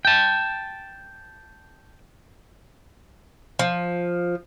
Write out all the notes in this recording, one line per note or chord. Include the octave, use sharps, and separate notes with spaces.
G5 A5
F3